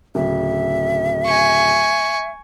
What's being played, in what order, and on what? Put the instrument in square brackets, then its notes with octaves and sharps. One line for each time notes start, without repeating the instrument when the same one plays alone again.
[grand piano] D1 C#3 [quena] E5
[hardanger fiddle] G#5 C#6